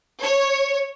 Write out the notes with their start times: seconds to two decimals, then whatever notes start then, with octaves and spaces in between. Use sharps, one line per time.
0.21 C#5